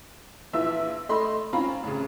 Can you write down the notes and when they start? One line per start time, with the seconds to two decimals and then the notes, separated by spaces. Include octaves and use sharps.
0.53 A#1 E3 F4 E5 E6
1.09 A3 D#5 B5 C6
1.53 C4 C#4 F4 F5 A#5 B5
1.83 A1 C#3